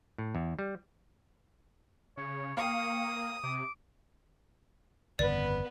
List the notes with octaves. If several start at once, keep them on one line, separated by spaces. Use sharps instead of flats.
A2
E2
G3
C#3 C#5
A#3 F5 G5 C#6 D#6
C3 D6
G1 F2 C#3 B3 B4 D5